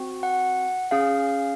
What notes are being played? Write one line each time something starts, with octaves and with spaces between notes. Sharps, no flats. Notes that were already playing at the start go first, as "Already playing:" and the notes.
Already playing: C4 F#4
F#5
C#4 G#4 F5